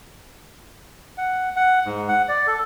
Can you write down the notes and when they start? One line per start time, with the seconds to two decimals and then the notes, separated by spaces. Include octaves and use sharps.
1.17 F#5
1.56 F#5
1.86 G#2
2.08 F#5
2.28 D5
2.47 A4